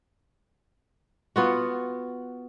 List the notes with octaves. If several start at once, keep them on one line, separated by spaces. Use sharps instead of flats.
B3 F4 F#4